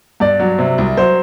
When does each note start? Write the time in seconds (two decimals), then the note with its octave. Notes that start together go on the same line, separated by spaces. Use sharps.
0.20 G2 D5
0.40 F#3
0.58 C3
0.78 C2
0.97 F#3 C5